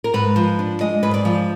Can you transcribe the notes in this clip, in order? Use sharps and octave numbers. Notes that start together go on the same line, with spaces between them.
A#4
G#2 B4
F3
D4
G#3 D#5
G#2 B4
D5
F3